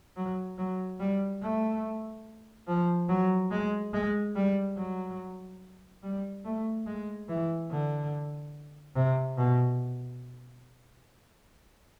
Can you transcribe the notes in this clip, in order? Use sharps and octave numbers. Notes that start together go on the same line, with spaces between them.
F#3
F#3
G3
A3
F3
F#3
G#3
G#3
G3
F#3
G3
A3
G#3
E3
D3
C3
B2